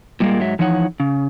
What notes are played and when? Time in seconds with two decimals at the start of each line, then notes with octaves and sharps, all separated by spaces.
0.20 A#2 G3 G#3 A#3
0.40 G#2 F#3 E5
0.59 E3 F3 D#4 C#5 F#5
1.00 C#3